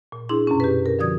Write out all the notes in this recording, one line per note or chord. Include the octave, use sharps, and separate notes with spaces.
A#2
D4 E4 G#4 C6
F#2 B2 C#4
G4 B4
A#4
D3 F3 F#4 D5 D#6 G#6